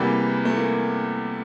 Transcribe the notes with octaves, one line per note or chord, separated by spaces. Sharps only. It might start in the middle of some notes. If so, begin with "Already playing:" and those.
Already playing: E2 C3 E3 G3 A#3
A3
A#3